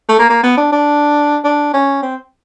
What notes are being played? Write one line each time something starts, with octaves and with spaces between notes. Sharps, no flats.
A3
A#3
A#3
B3
D4
D4
D4
C#4
C4